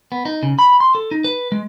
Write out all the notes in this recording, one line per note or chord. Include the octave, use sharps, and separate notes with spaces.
B3
D#4
C#3
B5
C6
A4
D#4
B4
G#3